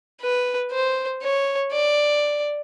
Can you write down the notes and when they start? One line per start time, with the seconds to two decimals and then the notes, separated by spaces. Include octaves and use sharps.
0.21 B4
0.71 C5
1.22 C#5
1.72 D5